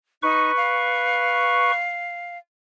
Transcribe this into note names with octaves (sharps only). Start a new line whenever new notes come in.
D#4 B4 C#6
F5